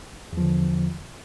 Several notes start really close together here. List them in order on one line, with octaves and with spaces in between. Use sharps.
E2 F3 D3